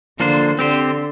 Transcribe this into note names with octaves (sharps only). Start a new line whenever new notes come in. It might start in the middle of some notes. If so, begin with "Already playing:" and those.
D3 F3 A#3 D4 F4 C5
D3 C4 G4 C5